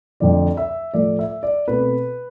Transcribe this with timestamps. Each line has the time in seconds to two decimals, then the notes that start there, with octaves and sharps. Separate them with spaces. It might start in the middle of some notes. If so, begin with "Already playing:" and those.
0.20 F2 D3 F3 A3 C4 D5
0.57 E5
0.94 A2 F3 A3 D5
1.19 E5
1.43 D5
1.68 B2 A3 C4 B4